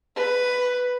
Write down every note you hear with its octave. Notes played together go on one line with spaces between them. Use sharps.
B4